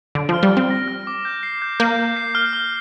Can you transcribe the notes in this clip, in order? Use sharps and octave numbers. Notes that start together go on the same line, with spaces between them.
D3 D7
F3
F6
G3
F6
C4
A#6
F6
D6
G6
C7
G6
A#3 G6
G6
C7
F6
F6